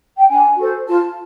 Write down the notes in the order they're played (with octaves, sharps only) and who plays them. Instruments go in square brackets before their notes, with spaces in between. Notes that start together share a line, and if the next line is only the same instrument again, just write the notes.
[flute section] G5
D4 G#5
F#4 A4 C5
F4 A5